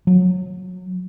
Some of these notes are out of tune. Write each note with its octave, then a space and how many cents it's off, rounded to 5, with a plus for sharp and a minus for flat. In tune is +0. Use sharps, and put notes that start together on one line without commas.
F#3 -20